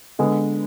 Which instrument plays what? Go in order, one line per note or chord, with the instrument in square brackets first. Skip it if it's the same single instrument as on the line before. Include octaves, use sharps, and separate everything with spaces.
[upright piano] D3 G#3 B3